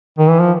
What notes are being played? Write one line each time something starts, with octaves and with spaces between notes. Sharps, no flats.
D#3
E3
F3